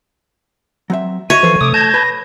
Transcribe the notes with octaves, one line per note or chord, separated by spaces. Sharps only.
F#3 C4 E5
F#4 C#5 D#5 E5 D#7
F#2 E3 F3 A4 C5
C3 A3 D6 D#6
A5 G6 G#6 A#6
B4